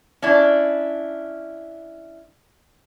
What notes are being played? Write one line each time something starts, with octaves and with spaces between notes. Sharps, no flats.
C#4 D4 E4